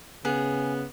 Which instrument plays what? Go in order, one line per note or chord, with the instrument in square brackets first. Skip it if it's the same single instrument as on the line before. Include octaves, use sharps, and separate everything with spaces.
[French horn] C#3 [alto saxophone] B3 [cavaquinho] G#4